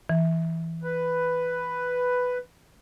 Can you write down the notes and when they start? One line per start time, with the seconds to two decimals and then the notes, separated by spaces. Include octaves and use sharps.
0.09 E3
0.83 B4